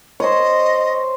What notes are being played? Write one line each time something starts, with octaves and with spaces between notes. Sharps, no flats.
C5 C#5 D#5